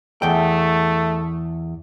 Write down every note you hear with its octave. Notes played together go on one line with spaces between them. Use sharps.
E2 A3 G5